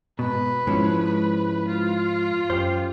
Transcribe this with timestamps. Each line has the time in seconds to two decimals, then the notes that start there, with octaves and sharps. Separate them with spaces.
0.19 G#2 B2 B4
0.67 G#2 F3 G#3 C#4 E4
1.67 F4
2.50 F#2 G4 C5